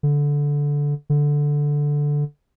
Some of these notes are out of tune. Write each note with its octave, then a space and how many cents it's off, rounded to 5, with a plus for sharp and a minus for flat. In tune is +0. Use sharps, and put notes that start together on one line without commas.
D3 -15
D3 -5